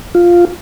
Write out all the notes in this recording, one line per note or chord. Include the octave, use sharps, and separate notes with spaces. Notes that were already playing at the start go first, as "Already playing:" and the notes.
F4